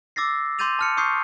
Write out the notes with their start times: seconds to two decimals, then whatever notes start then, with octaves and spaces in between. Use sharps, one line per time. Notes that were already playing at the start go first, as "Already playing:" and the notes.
0.16 D6 E6 A6 A#6 C7
0.59 C6 D6 G6 A6 D#7 F7
0.79 A5 F6 C#7
0.97 C#6 D#6 G6 C7